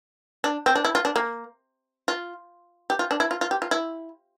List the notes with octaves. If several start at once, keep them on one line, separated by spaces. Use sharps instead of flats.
D4
C4
D4
E4
F4
D4
A#3
F4
G4
F4
D4
E4
F4
F4
G4
F4
E4